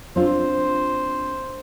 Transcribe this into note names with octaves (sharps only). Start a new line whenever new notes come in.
C4 D4 F4 C5